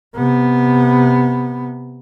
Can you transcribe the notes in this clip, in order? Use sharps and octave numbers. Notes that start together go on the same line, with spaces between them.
C3 B3